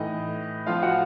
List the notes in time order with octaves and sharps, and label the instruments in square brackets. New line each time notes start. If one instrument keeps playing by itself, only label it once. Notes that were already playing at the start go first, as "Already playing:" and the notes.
Already playing: [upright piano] A2 E3 D#4 D#5
A2 F3 F4 F5
F#4 F#5